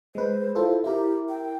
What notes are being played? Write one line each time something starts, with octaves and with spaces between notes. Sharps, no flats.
G#3 B4 C5
E4 F4 A4 C5
E4 G4 A#4
G5